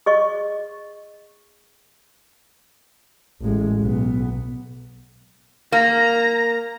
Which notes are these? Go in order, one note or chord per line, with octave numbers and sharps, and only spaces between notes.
G#4 D#5 C#6
A1 G#3
B1 B3
A#3 A#5